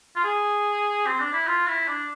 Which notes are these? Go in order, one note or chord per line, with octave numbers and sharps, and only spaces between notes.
F4
G#4
C4
D4
E4
F4
E4
D4